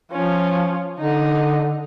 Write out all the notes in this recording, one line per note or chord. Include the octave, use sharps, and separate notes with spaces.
F3 C#4 F4
D3 D#4 D#5